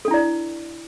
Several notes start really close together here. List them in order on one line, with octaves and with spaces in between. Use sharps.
A4 D4 E4 D5